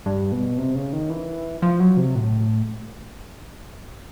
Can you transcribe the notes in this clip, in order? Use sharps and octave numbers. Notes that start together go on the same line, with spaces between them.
G2
B2
C3
C#3
D#3
E3
F3
F#3
C3
A2